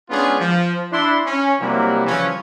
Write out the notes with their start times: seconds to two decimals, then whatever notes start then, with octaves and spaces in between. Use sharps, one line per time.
0.10 G#3 B3 C#4 D4 F4 G#4
0.40 F3
0.92 D4 E4 C6
1.26 C#4
1.60 C3 F#3 G3 A#3 E4
2.05 C#3 E3 F3 G3 C#4